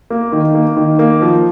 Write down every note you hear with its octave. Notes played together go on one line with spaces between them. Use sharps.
A#3
D#3
A#3
D#3
A#3
F3